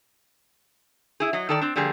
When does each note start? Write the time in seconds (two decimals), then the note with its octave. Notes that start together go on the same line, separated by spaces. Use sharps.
1.20 E4 G#4
1.33 F#3 D#5
1.49 D#3 A4 D5
1.61 C4 D4
1.76 D3 F3 G3 A#3 G#4